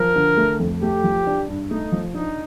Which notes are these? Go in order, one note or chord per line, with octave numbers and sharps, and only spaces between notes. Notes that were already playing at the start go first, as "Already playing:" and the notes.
Already playing: F3 A#4
D3
A3
F2
A3 G4
F3
D4
G2
A3 D#4
F3
D4 D#4